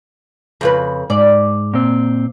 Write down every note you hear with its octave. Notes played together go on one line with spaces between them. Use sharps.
F2 C#3 B4
G#2 D5
A#2 C4